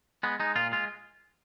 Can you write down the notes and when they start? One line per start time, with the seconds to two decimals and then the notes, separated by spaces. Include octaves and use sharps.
0.23 G#3 B3
0.40 G#3 D#4
0.56 A#2 F4
0.72 G#3 F4